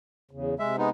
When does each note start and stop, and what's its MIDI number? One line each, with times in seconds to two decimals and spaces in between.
0.31 0.55 40
0.31 0.55 49
0.59 0.88 48
0.59 0.76 56
0.59 0.76 76
0.78 0.90 56
0.78 0.90 59
0.78 0.90 63